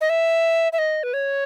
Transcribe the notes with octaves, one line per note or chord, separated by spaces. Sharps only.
D#5
E5
E5
D#5
B4
C#5